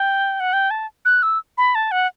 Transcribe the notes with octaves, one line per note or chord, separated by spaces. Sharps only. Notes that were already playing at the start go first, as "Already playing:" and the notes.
Already playing: G5
F#5
G5
A5
F#6
E6
B5
A5
F#5